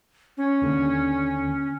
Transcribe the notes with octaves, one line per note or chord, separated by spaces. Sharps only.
C#4
D#2 D3